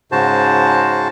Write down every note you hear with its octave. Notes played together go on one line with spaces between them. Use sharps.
G#2 C#3 F#4 C5 A5